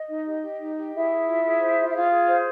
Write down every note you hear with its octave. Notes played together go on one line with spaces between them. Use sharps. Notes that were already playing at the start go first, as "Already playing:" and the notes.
Already playing: D#5
D#4
G4
G4
D#4
G4
E4 G#4 E5
G#4
F4
G#4
C5
F4
E5
F4 G#4 F5
G#4
C5